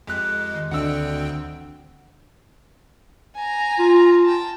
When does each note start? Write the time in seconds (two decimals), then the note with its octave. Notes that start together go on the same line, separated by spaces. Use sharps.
0.07 F2 G#3 G4 F#6
0.51 D#3 D#5
0.71 D2 D3 C4 F#5 G5 E6
3.36 G#5 A#5
3.79 F4
4.25 G5 A5